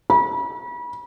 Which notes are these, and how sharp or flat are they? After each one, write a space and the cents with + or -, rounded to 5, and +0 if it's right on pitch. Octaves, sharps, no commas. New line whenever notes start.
B5 -35